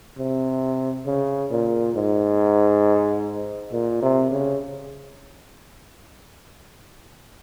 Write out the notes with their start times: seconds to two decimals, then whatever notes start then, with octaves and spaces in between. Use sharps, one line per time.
0.18 C3
1.06 C#3
1.51 A#2
1.96 G#2
3.72 A#2
4.02 C3
4.31 C#3